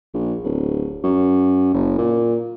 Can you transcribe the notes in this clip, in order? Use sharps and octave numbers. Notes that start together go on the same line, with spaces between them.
A#1
D1
F#2
F#1
A#2